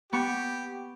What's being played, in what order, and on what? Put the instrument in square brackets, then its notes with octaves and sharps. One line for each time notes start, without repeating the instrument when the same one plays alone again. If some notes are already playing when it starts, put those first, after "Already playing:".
[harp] B3 C#6 [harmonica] G4